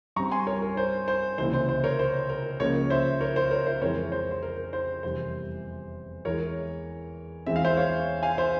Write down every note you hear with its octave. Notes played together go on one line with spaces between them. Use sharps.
G2 G3 C4 A#5 C#6
G#5 C6
A#4 C#5
A#4
C5
C5
C#2 C3 E3 A#3 C5
C5
C5
A#4 C#5
C5
A#4
C#2 C#3 F3 A#3 C#4 A#4 C#5
C5 E5
A#4 C#5
C5
A#4 C#5
C5 E5
F2 E3 G#3 C4 A#4 C#5
C5
C5
A#4
C5
F1 E2 C3 G3 C5
E2 E3 G#3 A#4 C#5
E2 E3 G#3 C4 E5
F5
C5 E5
C#5 F5
F5 G#5
C5 E5